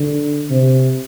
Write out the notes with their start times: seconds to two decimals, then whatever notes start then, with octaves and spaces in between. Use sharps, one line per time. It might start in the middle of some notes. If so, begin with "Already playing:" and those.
Already playing: D3
0.50 C3